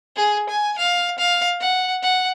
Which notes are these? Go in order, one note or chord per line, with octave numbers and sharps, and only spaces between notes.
G#4
G#5
F5
F5
F#5
F#5